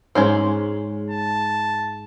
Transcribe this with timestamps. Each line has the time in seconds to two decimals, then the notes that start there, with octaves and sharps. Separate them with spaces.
0.15 G#2 G#3 C#4 C5
1.11 A5